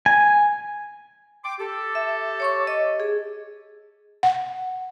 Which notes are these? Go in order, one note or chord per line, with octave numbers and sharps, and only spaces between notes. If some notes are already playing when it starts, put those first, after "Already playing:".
G#5
G5 C6 D6
G4 A4
E5
C#5 C#6 D6
D#5
G#4
F#5